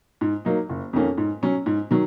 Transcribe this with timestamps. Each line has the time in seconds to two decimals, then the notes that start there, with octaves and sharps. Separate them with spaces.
0.21 G#2
0.45 F#3 A#3 D#4
0.69 F#1
0.93 F2 D#3 A#3 C#4
1.18 G#2
1.43 F#3 C#4
1.66 G#2
1.91 D#3 F#3